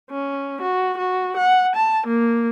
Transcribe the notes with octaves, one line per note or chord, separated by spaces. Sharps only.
C#4
F#4
F#4
F#5
A5
A#3